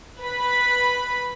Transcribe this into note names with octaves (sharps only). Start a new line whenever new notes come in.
B4 B5